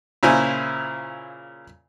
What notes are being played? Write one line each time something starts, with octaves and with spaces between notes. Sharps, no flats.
A#2 C#3 E4 C5 G#5